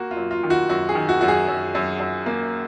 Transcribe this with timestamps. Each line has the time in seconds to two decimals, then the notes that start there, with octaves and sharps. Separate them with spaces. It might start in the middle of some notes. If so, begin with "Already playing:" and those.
Already playing: A#3 F#4
0.11 F4
0.17 F#2
0.31 F4
0.43 D#3
0.50 F#4
0.69 F#2 F#4
0.89 G#4
0.95 D#3
1.09 F#4
1.21 F#2 F#4
1.28 G#4
1.48 F#2
1.75 F#2
2.00 F#2
2.26 A#3